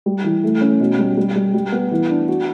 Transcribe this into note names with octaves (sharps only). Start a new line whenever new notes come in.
G3
E3
A3
C#4
B2
G3
G3
G3
G3
B3
E3
D4
F#4